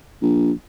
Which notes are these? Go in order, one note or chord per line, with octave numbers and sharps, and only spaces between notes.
A#1